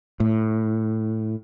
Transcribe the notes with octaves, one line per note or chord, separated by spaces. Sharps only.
A2